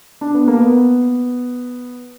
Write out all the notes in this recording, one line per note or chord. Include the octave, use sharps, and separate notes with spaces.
D4
B3
A#3
B3